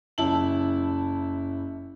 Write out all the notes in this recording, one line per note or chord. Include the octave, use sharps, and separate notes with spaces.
F#1 E4 A5 F#7